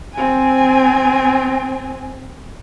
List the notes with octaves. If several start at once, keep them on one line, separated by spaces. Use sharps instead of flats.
C4 G#5